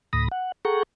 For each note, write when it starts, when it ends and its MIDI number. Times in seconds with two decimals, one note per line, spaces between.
0.13 0.28 38
0.13 0.28 45
0.13 0.28 83
0.13 0.28 87
0.13 0.28 94
0.32 0.52 78
0.65 0.83 68
0.65 0.83 69
0.65 0.83 78
0.65 0.83 79
0.65 0.83 82
0.65 0.83 85